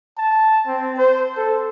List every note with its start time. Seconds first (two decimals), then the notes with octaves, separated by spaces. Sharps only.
0.18 A5
0.67 C4
0.98 C5
1.37 A4